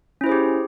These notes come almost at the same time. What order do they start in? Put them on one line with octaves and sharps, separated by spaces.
C#4 E4 C5 G#4 G4